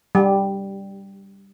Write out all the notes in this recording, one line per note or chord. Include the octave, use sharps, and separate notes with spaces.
G3